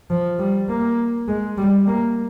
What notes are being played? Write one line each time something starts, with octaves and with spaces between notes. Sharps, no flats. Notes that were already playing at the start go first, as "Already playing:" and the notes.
F3
G3
A#3
G#3
G3
A#3